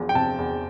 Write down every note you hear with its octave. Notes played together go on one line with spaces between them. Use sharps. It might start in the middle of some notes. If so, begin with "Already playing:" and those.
Already playing: E1 E2 F3
G5
C3 A5
E2